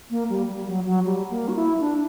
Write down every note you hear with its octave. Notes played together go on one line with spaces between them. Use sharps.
A#3
G3
G3
F#3
F#3
G3
A#3
F#4
E4
D4